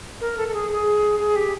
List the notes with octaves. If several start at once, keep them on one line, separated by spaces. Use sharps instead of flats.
A#4
A4
A4
G#4
G#4
G#4
G4